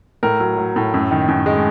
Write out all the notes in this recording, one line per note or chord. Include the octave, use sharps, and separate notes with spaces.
A2 A#4
F#3
F#3
A2
F#2
D#3
F#2
G#3